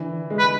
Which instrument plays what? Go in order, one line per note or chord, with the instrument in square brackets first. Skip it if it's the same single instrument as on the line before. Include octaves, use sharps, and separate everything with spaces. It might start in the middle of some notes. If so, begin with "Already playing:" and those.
Already playing: [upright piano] D3 E3
G#3
[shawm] B4